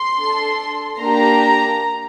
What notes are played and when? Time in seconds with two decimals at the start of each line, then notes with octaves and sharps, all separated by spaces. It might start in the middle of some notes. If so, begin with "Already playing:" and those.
Already playing: C6
0.17 D4 A4
1.00 A#3 D4 G4 A#5